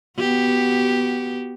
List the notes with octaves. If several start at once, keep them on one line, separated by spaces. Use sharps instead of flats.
B3 F#4 G4